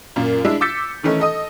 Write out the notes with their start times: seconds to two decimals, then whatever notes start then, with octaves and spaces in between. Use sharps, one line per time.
0.16 F#2 A#2 A#3
0.45 G#3 D4 E4
0.61 D6 E6 G6 A6 B6 C#7
1.03 D#3 E3 A3 C#4 D#4
1.20 A4 D#5 D#6